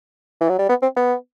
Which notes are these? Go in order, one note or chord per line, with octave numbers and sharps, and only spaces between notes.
E3
F#3
G3
B3
C4
B3